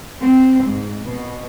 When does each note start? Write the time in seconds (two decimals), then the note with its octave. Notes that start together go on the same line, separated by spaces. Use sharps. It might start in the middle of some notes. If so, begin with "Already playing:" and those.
0.22 C4
0.65 G#2
1.08 B2